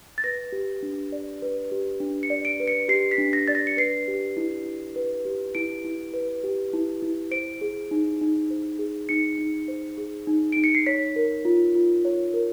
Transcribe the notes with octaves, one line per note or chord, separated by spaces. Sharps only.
A6
B4 A#6
G4
D4
D5
B4
G4
D4
C#7
D5
D7
B4
C#7
G4 C7
B6
D4
A#6
D5 A6
A#6
C#7
B4 C7
G4
E4
E4
B4
G4
E4 D7
E4
B4
G4
E4
E4
C5 D7
G#4
D#4
D#4
C5
G#4
D#4 C#7
D#4
C5
G#4
D#4
D#4 D7
C#7
C7
C#5 B6
A#4
F4
F4
C#5
A#4